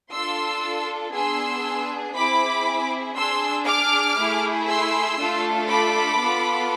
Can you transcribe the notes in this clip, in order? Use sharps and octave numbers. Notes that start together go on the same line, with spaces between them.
D4 F4 A4 C6 E6
B3 D4 G#4 C6 E6
C4 E4 G#4 B5 D6
D4 G#4 C6 E6
D6 F6
A3 E4 G#4
C6 E6
A3 D4 F4 A4
B5 D6
B3 F4 A4